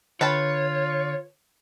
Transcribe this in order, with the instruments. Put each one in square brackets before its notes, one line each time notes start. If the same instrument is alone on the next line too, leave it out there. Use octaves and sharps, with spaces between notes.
[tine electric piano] D3 [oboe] F4 [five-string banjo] B4 G5 A5 [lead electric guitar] C#5